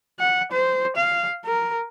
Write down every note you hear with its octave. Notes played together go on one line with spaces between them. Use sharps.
F#5
C5
F5
A#4